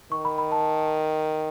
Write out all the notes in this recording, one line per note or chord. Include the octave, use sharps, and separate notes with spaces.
D#3 C#6
B5
B5
A5